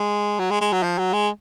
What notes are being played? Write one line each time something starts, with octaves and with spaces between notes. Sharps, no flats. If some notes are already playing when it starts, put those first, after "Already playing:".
Already playing: G#3
F#3
G#3
G#3
F#3
F3
F#3
G#3